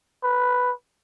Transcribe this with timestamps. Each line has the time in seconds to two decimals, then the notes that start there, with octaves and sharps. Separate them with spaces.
0.23 B4